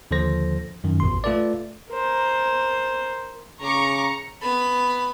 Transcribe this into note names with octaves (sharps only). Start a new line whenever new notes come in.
D#2 D3 F3 A4 C5 A#6
F#2 D#3
A1 E2 B2 C6
A3 F4 A4 B4 D5
A#4 C5
C#3 A#5 C#6 D6 C#7
B3 B5